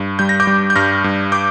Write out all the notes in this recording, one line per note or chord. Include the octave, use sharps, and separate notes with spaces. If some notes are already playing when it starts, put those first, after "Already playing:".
Already playing: G2
G3 G6
A#6
D6 G6
G3
G6
G2 F6 A#6
G2
D6 G6